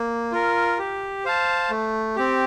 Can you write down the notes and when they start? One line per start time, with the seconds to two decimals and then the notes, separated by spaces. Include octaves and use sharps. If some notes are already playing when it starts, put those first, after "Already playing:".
Already playing: A#3
0.32 F4 A#4
0.78 G4
1.25 C5 F5 A5
1.70 A3
2.16 C4 G4